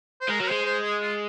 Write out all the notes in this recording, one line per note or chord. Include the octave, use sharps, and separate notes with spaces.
C5
G#3 A#4
F#3 A#4
G#3 C5
C5
G#4
F4